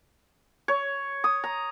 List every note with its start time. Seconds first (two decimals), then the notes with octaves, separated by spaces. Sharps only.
0.68 C#5
1.24 D#6
1.44 A#5